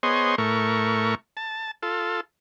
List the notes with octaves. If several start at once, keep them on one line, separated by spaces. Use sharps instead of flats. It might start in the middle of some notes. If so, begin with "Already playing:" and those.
B3 G#4 C5 C#5 D#5 C6
A2 A3 A#4 C#6
A5
F4 A4